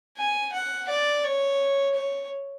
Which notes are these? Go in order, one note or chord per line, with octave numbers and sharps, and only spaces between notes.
G#5
F#5
D5
C#5
C#5